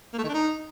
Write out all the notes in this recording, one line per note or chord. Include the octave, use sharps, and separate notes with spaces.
A#3
A3
D#3
D4
D#4